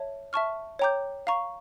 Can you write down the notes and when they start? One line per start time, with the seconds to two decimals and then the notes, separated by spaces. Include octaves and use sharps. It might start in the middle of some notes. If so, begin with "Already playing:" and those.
Already playing: C#5 E5 A5
0.33 E5 A5 C#6 F6
0.79 C#5 G5 A#5 D6 G6
1.27 F5 A#5 C#6